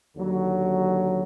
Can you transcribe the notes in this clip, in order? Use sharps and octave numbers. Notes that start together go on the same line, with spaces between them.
D#2 D3 F#3